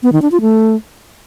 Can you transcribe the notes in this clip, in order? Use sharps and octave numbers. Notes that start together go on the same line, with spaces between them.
B3
D#3
D4
F4
A3